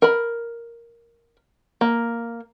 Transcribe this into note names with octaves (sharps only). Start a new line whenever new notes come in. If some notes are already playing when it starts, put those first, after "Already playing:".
A#4 B5
A#3